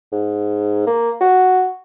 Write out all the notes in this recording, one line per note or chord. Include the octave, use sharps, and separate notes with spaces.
G#2
A#3
F#4